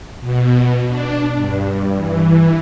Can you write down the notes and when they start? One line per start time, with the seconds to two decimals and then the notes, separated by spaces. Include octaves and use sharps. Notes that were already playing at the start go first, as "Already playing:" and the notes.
0.21 B2
0.88 D4
1.36 G2
1.97 E3